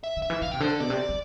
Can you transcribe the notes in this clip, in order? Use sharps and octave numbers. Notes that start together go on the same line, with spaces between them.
E5
D3
E5
E3
D3 F5
C3 G5
D3 C5
A4
B2 D5
C3
G3